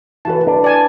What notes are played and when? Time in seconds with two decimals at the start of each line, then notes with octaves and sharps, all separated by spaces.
0.25 E3 F#4 B4 A5
0.47 D4 B4
0.64 D5 G#5 A5